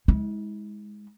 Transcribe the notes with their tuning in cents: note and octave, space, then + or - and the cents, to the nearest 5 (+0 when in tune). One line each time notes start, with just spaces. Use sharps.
G#3 +0 E4 -40